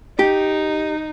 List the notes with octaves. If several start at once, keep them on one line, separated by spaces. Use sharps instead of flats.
D#4 G4